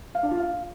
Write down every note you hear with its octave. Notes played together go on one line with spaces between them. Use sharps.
F5
D4
F4
F5